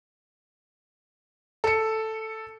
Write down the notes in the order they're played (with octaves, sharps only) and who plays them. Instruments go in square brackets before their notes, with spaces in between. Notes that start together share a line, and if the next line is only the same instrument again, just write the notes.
[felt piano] A4 C#7